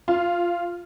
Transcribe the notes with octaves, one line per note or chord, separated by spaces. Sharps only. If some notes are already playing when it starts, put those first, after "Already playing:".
F4